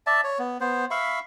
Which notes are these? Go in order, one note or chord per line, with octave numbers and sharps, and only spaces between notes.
D5 E5 A5
C#5
B3
B3 C5
E5 F5 B5 C#6